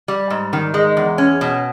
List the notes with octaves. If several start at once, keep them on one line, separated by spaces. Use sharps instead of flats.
G3
G#2
D#3
G#3
E2
C#4
B2